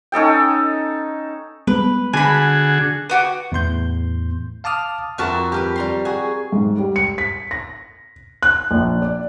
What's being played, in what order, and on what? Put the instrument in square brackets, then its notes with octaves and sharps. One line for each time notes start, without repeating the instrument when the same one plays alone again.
[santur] C#4 D#4 A4 G5
[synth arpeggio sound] G3 G#3 B3 [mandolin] B4
[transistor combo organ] D3 F#4 G#4 [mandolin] G#5 B5
[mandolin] B3 F#4 G4
[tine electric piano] E2 A2 C6 G6
F5 A5 D6 D#6 F6
[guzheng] F2 F#4 A#4 E5 A5
G4 A#4 B4
G3 A#5 C6
F#4 G#4
[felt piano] G#2
G3
C#7
B6
A#6
F#6
A#1
D5